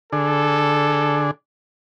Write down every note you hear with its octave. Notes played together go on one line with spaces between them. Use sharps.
D3 D4 G#4 A4